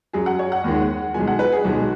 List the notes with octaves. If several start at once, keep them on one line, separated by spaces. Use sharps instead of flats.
F#2 F#3 G#4
F#5
C#5
F#5
D#2 D#3 G#3
B1 B2 G#3 G#5
F#5
B4
G#4
B1 B2 G#3 F#4